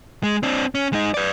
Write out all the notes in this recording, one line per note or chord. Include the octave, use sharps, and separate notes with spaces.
G#3
C4 D4
C#4
G#3 D#4
B4 D5